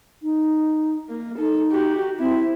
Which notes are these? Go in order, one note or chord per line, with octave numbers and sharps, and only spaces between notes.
D#4
A#3
D#4 A4
F#4 G4
C4 E4